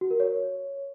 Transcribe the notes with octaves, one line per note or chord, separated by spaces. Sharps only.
F#4
A#4
C#5